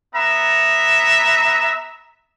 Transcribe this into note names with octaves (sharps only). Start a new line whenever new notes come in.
B3 E5 A#5